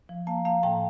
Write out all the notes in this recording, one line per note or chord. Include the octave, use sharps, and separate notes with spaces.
F3
A#3 F5 A5
A#3 F5 A5
A2 G5 A#5